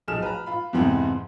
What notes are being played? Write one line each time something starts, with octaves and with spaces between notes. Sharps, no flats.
B1 F3 G#4 F6 E7
B4 A#5
F4 B5
F2 G#2 C3 E3 B3 C4